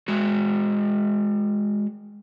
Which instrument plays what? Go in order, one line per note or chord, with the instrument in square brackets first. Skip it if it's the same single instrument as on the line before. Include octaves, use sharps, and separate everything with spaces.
[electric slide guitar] G#3 F#4